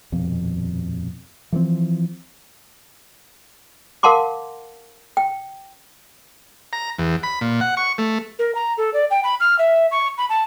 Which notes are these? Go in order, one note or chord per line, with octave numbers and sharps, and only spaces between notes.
D#1 F2 B2
E3 F3 G#3 C4
A#4 F5 F#5 A5 C6 D6
G5
A#5
E2
B5
A#2
F#5
C#6
A3
A#4
A#5
A4
D5
G5
B5
F6
E5
C#6
B5
A5